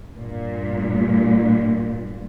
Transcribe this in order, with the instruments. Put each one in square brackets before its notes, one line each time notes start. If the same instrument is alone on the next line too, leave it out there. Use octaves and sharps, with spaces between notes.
[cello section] G2 A#2